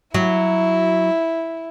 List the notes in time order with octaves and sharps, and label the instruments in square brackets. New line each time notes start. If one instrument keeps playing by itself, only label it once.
[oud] F#3 [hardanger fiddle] E4